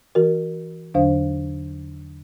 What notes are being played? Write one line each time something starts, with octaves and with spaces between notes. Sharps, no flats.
E3 F#4 A#4
E2 D3 F#3 D4 C5 F5